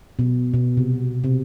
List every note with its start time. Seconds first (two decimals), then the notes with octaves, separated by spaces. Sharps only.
0.19 B2
0.54 B2
0.77 C3
1.24 C3